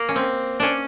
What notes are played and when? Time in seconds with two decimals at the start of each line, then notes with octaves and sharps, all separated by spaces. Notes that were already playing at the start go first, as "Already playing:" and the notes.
Already playing: A#3
0.09 C#4
0.16 C4
0.60 C#4 D4